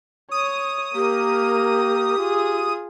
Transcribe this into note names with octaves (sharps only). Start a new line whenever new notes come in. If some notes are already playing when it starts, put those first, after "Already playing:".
C#5 D#6
A#3 G4 A#4
F4 G#4